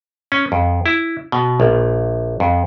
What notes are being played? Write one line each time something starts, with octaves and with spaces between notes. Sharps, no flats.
C#4
F2
E4
B2
A#1
F2